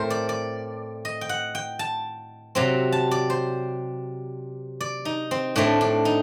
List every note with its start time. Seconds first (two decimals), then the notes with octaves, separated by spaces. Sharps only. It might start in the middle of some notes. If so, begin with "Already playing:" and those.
Already playing: A2 A3 C4 A#4 C5
0.10 D5
0.29 D5
1.05 D#5
1.21 G5
1.29 F#5
1.55 G5
1.79 A5
2.55 C3 F#3 C4
2.92 A5
3.11 D5
3.30 C5
4.81 D5
5.05 D#4
5.31 C4
5.56 A2 A3 C4 D4
5.81 D4
6.05 D#4